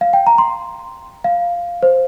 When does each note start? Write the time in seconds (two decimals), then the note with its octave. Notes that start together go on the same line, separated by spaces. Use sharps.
0.01 F5
0.13 G5
0.27 A#5
0.38 C6
1.24 F5
1.83 C5